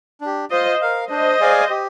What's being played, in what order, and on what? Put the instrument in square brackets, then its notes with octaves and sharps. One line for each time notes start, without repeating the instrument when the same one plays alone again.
[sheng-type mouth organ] D4 G4
[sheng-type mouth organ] F4 [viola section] C5 D#5
[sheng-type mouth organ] A#4 F5
[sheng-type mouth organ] D4 [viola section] C5 D#5
[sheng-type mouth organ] G#4 D5 F5 G#5
G4